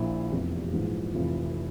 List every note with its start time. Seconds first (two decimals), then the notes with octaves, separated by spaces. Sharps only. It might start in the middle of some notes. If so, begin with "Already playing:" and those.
Already playing: A#1 A#2 E4
0.31 F1 E2 C3 E3
0.68 G4
0.73 A#1 G#2 E3 F4
1.15 F1 F2 E3 F4